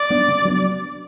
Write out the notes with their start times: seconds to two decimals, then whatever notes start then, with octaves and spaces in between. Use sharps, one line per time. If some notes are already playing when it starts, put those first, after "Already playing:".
Already playing: D5
0.10 G3 B3 D4
0.28 C#3
0.45 F#3 B3 D4